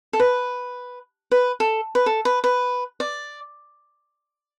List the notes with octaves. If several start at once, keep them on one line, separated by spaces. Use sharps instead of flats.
A4
B4
B4
A4
B4
A4
B4
B4
D5